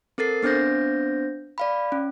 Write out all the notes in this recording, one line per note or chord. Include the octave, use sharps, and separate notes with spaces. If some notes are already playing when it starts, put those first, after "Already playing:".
C4 A4 A#4 A6 C7
B3 C4 D4 C5 G6 A#6
D5 F5 B5
C#4